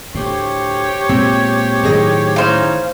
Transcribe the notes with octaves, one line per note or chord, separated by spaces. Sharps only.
D2 A2 G4 C5 C#5
A#2 G#3 C4
A2 D#3 F#3 G#4 D#5
E3 C#4 D#4 C5 F5